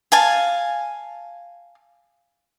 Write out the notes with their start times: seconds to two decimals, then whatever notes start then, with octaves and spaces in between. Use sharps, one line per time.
0.12 F5 G#5 A5